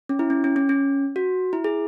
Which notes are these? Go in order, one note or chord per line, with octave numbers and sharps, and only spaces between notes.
C#4
E4
C#4
C#4
C#4
C#4
F#4
E4
G#4